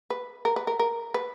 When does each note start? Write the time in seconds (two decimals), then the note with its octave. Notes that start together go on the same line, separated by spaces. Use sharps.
0.10 B4
0.45 A#4
0.56 B4
0.67 A#4
0.79 A#4
1.14 B4